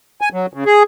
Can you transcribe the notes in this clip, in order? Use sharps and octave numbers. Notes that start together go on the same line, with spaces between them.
G#5
F#3
C#3
G#4